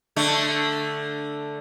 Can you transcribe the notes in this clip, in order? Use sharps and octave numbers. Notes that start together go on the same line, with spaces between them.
D3 A3